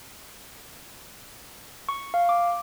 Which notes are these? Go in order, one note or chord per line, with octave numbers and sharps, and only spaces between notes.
C#6
F5
D6